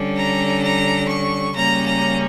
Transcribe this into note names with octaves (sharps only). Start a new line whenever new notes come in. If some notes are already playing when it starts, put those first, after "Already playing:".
Already playing: D3 G3 C#4
A#5
A#5
C#6
C#3 G3 A#3 C#4 A#5
A#5